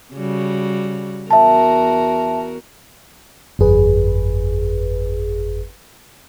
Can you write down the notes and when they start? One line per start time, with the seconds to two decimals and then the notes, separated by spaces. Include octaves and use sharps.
0.13 C#3 G3 F#4
1.30 E2 F#4 A#4 E5 A5
3.59 G1 F2 G#4 B4